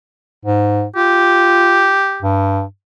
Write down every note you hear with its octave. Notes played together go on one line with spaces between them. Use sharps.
G#2
F4 G4
G2